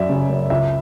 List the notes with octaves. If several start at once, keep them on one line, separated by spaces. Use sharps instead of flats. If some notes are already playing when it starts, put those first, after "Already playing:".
Already playing: F#2 F#3 D5 E5
C#3
F#2
C#2 E5